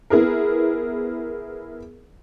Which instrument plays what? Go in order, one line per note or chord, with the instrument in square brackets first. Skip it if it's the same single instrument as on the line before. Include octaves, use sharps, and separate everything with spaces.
[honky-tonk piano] B3 E4 G#4 A#4